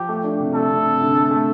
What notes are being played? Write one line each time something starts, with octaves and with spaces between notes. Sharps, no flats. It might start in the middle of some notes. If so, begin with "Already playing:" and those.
Already playing: F3 G4
A3
D4
C3
A3 A4
C3
C3
D3
A3
A3